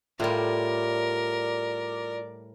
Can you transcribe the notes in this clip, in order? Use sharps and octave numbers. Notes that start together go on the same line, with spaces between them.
A2 G3 F4 A#4 D5